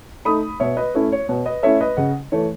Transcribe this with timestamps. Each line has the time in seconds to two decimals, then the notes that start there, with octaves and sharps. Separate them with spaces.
0.25 A3 D#4 B5 D#6
0.60 B2 C#5 E5
0.77 B4 D#5
0.95 A3 C#4 E4 C#5
1.12 C#5
1.28 B2 C#5
1.46 B4 D#5
1.63 A3 C#4 E4 C#5 E5
1.81 B4 D#5
1.97 C#3 D#5 F#5
2.32 E3 A3 C#5